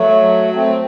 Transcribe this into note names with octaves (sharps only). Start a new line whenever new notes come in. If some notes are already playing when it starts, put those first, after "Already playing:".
Already playing: F#3 A3
A3 C4